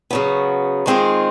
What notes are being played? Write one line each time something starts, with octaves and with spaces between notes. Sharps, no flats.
C#3 F#3 B3
D#3 G#3 C4 F4 G#4